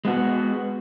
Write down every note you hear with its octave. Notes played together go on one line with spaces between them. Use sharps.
G#3 B3 F#4